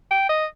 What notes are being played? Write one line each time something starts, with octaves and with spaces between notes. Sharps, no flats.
G5
D#5